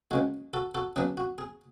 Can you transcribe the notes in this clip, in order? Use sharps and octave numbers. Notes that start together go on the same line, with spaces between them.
C#2 C#3 G#3 F#4
F#4 A4
F#4 A4
C#3 F#3 B3 D4 G#4
F#4
G#4